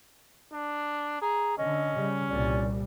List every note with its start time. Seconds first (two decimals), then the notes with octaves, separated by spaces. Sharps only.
0.52 D4
1.21 G#4 A#5
1.58 D3 C#4 D#5
1.94 C#3 G3
2.29 C2 A#2 G3 D5